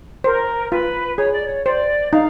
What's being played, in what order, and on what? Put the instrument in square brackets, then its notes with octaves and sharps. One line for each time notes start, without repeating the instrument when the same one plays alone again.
[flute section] A#4 [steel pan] C5
[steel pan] F4 [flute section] B4
[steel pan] G#4 [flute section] C#5
[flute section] D5
C#5
[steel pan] C5 [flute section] D5
[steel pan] D#4 [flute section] F5